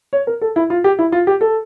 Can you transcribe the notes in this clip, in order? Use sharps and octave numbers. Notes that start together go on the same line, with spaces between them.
C#5
A#4
A4
E4
F4
G4
E4
F4
G4
A4